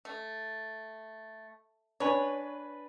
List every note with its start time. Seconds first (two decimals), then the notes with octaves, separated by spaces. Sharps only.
0.05 A3
2.00 D4 B4 C#5 G#5